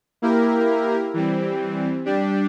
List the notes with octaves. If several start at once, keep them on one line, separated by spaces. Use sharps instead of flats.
A#3 E4 G4 A#4
E3 G3 C4
G3 D4 G4